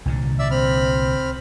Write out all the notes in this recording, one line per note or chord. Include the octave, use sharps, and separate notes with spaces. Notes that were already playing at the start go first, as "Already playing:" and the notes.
C2 A#2 D3
D5 E5 E6
C4 B5 F6